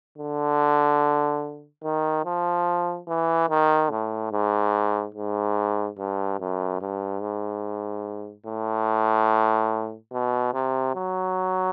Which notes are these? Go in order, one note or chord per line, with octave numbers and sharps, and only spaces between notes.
D3
D#3
F3
E3
D#3
A2
G#2
G#2
G2
F#2
G2
G#2
A2
B2
C3
F#3